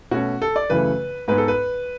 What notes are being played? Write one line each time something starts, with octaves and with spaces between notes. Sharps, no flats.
B2 A3 C#4 F#4
A4
D5
F#2 C#3 E3 A3 B4
G#2 G#3 B3 B4
A4
B4